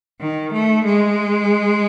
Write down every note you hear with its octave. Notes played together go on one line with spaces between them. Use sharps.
D#3
A3
G#3